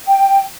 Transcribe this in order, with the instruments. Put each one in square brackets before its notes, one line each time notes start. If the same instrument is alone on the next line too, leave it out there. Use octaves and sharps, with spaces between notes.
[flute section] G5